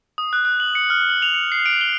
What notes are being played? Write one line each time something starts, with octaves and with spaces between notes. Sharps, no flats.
D#6
F#6
F#6
F#7
C#7
F6
F#7
F7
C#7
C7
D7
G7